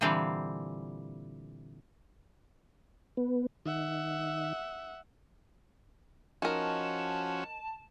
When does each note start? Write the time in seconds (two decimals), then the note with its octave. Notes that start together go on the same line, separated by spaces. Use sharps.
0.01 A#2 D3 E3 G3 C4 F5
3.17 B3
3.66 D#3 E5 F#5
6.42 F3 C#4 D#4 F#4 A#4 A5